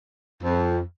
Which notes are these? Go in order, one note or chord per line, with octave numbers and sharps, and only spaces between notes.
F2